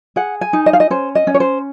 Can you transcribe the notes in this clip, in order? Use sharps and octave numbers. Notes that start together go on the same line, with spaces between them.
G#4 F#5
G#5
D#4
D#5
F5
D#5
C#4 C5
D#5
C#4
C#5
C5